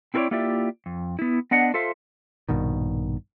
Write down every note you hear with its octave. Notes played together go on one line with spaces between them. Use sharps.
C4 E4 A4 A#4 C#5 D5
A#3 E4 F4 G4 D5 E5
F2
B3 E4
B3 D4 D#5 F#5
F4 A4 C5 E5 F5
A#1 G2 B2 D#3